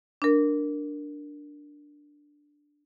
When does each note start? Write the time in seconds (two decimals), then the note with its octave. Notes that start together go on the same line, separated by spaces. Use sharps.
0.22 D4 A#4